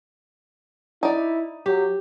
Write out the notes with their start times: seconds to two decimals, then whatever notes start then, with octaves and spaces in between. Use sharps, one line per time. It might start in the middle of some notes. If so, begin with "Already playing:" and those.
1.03 D#4 E4 D5
1.66 F#3 G4